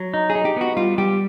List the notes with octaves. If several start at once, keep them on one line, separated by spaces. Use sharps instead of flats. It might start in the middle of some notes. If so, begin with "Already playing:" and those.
Already playing: F#3
D#4
G#4
D#4
G4
B3 F#4
G3 F4
G3 G4